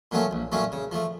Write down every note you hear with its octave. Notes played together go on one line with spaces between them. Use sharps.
A#2 F#3 A3 C#4
A#1
A#2 F#3 A3 C#4
C#3
F3 A3